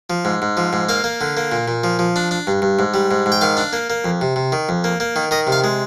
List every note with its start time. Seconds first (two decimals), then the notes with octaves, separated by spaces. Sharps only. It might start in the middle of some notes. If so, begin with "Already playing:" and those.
0.10 F3
0.25 G#2
0.42 G#2
0.57 F3
0.73 G#2
0.89 A#3 F5
1.04 A#3
1.21 D3
1.37 A#3
1.52 A#2
1.68 A#2
1.84 F3
1.99 F3
2.16 D4
2.31 D4
2.47 G2
2.62 G2
2.79 G#2
2.94 G3
3.11 G#2
3.26 G#2
3.32 G5
3.41 D#3 F5
3.57 D4
3.73 A#3
3.90 A#3
4.05 F2
4.21 C3
4.36 C3
4.52 D#3
4.69 F2
4.84 A#3
5.00 A#3
5.16 D#3
5.31 D#3 D#5
5.47 C3
5.52 F5
5.64 G#3